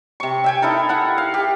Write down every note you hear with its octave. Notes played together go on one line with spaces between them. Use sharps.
C3 C#6
E5 G5 G#5
D#4 E4 A4 A#4
E4 F#5
F5
G4